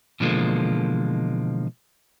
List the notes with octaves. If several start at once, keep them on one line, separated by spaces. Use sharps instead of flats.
B2 D3 E3 F3 G#3 A#3